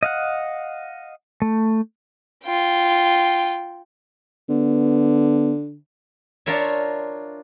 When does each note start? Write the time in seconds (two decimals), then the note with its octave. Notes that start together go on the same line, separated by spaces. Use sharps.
0.03 D#5 F5 F#5
1.42 A3
2.45 F4 G5
4.49 D3 B3
6.46 D4 F4 A#4 C#5 E5